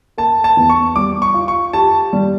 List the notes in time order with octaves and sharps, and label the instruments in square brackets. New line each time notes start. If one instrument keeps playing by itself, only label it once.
[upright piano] A#3 [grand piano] A5
[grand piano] A5
[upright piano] E2
[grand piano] C#6
[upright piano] G3 [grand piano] D6
[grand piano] C#6
[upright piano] F4
[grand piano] C#6
[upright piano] G4 [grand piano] A5
[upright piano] G3